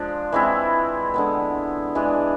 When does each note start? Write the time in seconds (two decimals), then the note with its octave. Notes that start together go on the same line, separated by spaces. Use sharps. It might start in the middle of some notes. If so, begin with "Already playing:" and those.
Already playing: F3 G#3 D4
0.32 E3 G#3 C4 E4
1.14 D3 G#3 B3
1.95 E3 G#3 D4 G#4